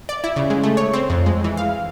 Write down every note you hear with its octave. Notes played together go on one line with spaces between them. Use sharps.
D5
E4
C#3
G#3
A3
C#5
C4
F2
G#3
E3
F5